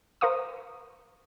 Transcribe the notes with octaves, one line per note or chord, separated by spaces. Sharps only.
A#4 C5 F5 C#6 D#6